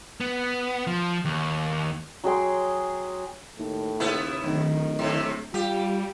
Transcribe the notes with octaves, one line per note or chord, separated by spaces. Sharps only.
B3
F3
D#2
F#3 G#4 G5 C6
D#2 A2
D#2 C3 B3 E4
D1 D#3 D#4
G#2 C3
G3 F4 G4